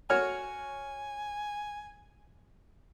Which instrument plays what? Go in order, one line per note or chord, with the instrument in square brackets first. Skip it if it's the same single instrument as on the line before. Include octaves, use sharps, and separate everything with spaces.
[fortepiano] F#4 C#5 F6 [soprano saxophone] G#5